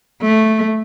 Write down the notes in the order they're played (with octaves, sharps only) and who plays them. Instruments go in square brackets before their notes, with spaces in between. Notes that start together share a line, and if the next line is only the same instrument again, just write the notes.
[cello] A3